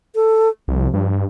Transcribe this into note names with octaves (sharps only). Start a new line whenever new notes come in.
A4
C2 F3
G2